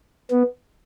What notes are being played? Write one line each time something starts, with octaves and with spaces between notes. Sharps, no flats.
B3